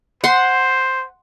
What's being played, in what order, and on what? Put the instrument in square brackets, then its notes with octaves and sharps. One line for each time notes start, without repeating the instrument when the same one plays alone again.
[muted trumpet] C5 [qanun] F#5 C6